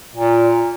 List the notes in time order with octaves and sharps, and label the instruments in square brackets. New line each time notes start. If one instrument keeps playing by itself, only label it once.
[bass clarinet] A#2